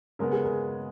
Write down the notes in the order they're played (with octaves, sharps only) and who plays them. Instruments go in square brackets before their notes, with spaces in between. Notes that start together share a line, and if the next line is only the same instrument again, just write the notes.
[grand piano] C#3 G#3 B3 [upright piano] A#4
[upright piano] G#4
A#4